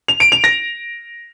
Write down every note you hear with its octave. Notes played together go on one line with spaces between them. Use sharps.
F7
D7
F7
A#6